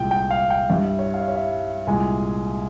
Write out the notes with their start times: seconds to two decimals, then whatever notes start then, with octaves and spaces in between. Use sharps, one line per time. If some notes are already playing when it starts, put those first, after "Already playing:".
Already playing: C2 A#2 G#3 G5
0.11 G5
0.31 F5
0.50 G5
0.70 G2 G3 E5
0.85 E5
0.99 C#5
1.14 F5
1.20 E5
1.28 C#5
1.35 E5
1.87 C2 A#2 G#3 G#5